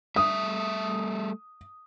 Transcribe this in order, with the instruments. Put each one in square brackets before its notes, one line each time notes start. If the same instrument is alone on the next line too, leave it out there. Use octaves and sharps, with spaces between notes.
[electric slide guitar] G3 A3 E5 [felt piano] D#6